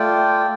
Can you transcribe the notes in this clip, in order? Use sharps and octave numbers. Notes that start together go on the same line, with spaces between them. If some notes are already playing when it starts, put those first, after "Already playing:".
Already playing: A3 F4 D5 G5